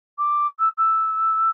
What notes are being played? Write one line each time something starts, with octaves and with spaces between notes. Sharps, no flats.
D6
E6
E6